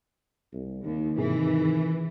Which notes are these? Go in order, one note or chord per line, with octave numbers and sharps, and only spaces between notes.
C2
D#2 D#3
G#2 C3 D#3 E3 G#4